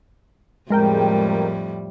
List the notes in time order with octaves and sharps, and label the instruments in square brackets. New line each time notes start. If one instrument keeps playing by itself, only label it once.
[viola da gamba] F2 A2 G3 [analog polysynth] G#3 A#4 G5